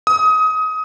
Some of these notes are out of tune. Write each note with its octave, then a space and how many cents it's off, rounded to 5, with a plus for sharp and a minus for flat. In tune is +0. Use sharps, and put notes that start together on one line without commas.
D#6 +25